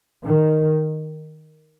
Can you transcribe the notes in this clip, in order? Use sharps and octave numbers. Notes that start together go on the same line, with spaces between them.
D#3